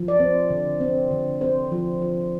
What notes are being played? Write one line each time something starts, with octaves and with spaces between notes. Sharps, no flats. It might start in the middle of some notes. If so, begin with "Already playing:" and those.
Already playing: F3
D5
C4 C5
D3
C4
D3
C4 C5
F3
F3